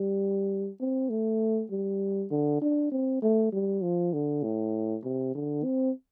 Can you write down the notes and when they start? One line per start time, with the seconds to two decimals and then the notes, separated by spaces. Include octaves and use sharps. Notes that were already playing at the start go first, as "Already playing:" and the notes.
Already playing: G3
0.80 C4
1.10 A3
1.71 G3
2.31 D3
2.61 D4
2.91 C4
3.22 A3
3.52 G3
3.83 F3
4.13 D3
4.43 A2
5.04 C3
5.35 D3
5.64 C4